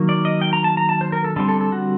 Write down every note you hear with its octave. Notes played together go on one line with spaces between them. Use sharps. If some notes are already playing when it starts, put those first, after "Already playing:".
Already playing: D#3 F#3 A#3
D5
D#5
G5
A#5
A5
A#5
A5
C5
A#4
A4
D3 G3 C4 A4
A4
A4
F#4